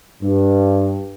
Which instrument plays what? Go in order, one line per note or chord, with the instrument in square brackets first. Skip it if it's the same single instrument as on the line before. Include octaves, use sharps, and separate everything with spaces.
[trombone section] G2